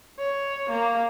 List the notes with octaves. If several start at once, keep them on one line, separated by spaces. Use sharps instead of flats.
C#5
A#3